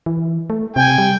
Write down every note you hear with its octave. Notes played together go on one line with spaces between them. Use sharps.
E3
A3
C3 G5 G#5
G3